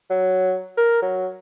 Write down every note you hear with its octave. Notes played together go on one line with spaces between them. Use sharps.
F#3
A#4
F#3